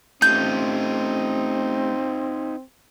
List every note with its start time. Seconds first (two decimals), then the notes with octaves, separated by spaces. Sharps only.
0.22 A3 C4 C#4 D#4 F4 G4 G6